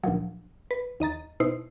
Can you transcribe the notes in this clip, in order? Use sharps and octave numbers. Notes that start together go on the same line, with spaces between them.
D2 A#2 F3 F#3
B4
D#2 D#5 A#5 A6
B2 D#4 E4 C5 C7